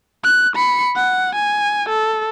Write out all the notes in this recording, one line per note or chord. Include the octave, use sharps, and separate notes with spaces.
F#6
B5 C#7
F#5
G#5
A4